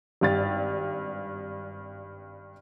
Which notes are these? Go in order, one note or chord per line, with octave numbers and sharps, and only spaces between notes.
G#1 G2 A6